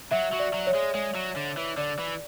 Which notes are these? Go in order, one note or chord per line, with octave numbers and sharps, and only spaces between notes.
F#3 E5
F#3
D5
F#3
C#5
G#3
G#3
F#3
D3
E3
D3 D5
E3